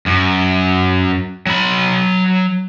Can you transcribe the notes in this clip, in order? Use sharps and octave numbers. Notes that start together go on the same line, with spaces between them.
F#2
F#3 B5